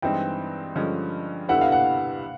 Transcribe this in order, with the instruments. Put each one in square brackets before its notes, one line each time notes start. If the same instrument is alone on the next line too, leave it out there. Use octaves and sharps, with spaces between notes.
[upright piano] G2 E3 G#3 C4 D#4 [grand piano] G5
[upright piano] G2 D3 F3 G#3 C#4
[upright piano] G2 D3 G3 B3 E4 [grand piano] F#5
[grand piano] F5
F#5